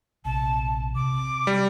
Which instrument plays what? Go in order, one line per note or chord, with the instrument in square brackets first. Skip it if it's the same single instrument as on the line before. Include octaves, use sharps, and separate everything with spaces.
[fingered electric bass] A#1 C3 [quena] A5
[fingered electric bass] C3 [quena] D6
[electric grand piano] G3